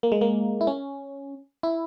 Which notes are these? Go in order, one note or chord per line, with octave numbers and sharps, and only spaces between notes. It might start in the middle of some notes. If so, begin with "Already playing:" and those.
A#3
G#3
A#3
E4
C#4
E4